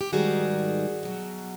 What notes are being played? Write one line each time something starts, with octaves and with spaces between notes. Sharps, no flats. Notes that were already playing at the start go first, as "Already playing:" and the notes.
G4
G#2 D#3 G3 F#4 G#4
B2 F#3